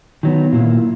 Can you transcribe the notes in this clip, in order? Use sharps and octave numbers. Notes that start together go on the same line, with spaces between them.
D#3 F#3 B3
A#2 A#3 E4